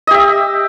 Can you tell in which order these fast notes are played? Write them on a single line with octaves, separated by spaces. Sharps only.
D#5 G4 E5